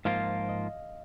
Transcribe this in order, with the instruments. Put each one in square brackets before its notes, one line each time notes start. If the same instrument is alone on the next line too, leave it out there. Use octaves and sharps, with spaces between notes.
[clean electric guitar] G#2 F3 A#3 F4 [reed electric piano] F5
[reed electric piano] D#5